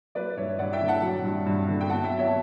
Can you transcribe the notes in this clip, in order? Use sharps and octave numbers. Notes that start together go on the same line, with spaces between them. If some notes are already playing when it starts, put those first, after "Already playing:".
F#3 B4 D5
G2 C#5 E5
G2 D5 F#5
E5 G5
D3
F#5 A5
F#3
G2
G2
D3
G5
B2 F#5 A5
E5 G5
F#3
C#5 E5
A5